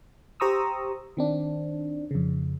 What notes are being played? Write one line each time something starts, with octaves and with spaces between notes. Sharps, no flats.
G4 C5 A#5 C#6 D#6 E6
D#3 C4 D4
F2 C#3